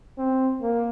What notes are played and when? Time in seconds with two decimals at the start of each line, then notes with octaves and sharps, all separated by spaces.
0.18 C4
0.62 A#3